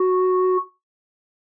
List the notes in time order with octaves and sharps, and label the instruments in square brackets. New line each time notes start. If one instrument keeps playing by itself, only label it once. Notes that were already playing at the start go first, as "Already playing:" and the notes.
Already playing: [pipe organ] F#4